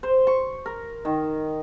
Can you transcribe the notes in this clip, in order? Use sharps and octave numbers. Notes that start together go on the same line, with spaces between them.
C5
C#6
A#4
D#3